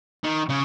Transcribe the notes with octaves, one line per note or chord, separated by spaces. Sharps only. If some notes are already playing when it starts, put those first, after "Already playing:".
D#3
C#3